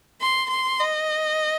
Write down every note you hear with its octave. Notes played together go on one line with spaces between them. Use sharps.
C6
C6
D#5